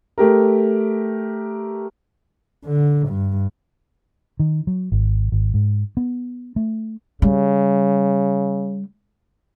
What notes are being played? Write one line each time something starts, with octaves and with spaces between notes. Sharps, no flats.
A3 G4 A#4
D3
G2
D#3
F#3
G#1
G#1
G#2
B3
A3
C#3 G3